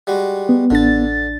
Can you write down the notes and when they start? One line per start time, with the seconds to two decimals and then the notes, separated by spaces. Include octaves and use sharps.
0.07 G3 G#3 F#4
0.49 B3
0.70 A1 D3 D4 A6